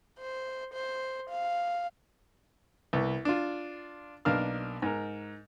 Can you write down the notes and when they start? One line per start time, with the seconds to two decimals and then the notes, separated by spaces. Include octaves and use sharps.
0.19 C5
0.73 C5
1.30 F5
2.93 C2 B3
3.25 D4 F4
4.25 B1 A#3 D4 A#4 F5 F6
4.82 G#2 A#4